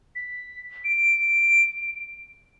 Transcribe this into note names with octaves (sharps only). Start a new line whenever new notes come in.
B6
D7